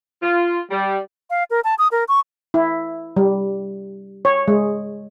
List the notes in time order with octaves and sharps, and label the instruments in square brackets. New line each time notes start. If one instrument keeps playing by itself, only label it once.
[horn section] F4
G3
[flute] F5
A#4
A5
D#6
A#4
C#6
[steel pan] E4
G3
C#5
G#3